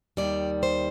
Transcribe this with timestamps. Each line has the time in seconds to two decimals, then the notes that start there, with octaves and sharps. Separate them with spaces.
0.17 D#2 D#3 G3 D5
0.63 C5